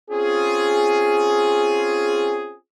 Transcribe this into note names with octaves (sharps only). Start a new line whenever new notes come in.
C4 C#4 F4 G#4